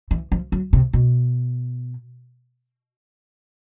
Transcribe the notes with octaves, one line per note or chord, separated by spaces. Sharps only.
E3
F3
F#3
C3
B2